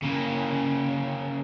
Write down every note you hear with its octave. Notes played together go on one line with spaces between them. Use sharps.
C#3 A#3